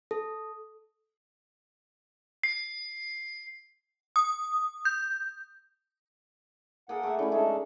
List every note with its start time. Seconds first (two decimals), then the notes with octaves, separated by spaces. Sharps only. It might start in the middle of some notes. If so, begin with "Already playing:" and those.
0.11 A4
2.44 C7
4.16 D#6
4.85 G6
6.89 A#3 G#4 A4 F#5
7.03 A3 E5
7.19 D3 E3 A3 C#4 E4
7.32 G#3 C#4 D#4 G#4 A4